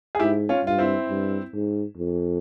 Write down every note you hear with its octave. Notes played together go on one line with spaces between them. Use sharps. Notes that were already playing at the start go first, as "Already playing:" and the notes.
G#4
G#2 E4 G4
C#4 F4
G2 F4
C4 E4
G2
G#2
F2